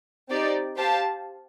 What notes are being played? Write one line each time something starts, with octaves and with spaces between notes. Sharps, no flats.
C4 D#4 G4 D5
G4 C5 F5 A5